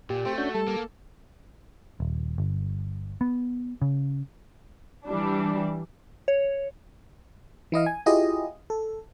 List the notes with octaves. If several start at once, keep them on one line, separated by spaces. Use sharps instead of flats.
A#2 G4
A3 C4
C#4 D4 F#4 G6
G3 A4
A#3
D#1
G1
B3
C#3
E3 G3 D4
C#5
E3 E4 D#5 F5
G#5
E4 F4 G4 G#4 D#5
A4